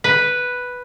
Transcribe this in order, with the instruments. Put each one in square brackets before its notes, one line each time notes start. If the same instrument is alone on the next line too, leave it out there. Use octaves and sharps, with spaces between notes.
[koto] B4